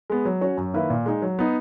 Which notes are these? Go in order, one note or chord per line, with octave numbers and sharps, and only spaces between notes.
G#3 B3
F#3
C#4 F#4 C#5
F#2
D#3 A#3 E4 B4
A#2
G#3 D#4
F#3
B3 D#4